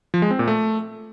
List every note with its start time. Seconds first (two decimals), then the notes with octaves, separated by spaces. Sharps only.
0.14 F3
0.22 G#3
0.31 C4
0.39 A#2
0.48 A3